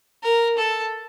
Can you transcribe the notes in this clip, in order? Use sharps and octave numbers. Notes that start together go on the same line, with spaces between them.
A#4
A4